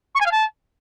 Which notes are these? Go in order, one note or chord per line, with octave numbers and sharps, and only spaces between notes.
C#6
G#5
F5
A5